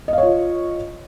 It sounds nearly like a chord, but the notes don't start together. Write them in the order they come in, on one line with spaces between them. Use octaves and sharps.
D#5 F5 C#5 F4